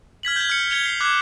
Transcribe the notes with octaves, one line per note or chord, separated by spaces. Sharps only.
F6 G#6 B6 F#7
G6 G#6
F6 C#7
G#6 C#7 F7 G7
C7
D6 F#6 G#6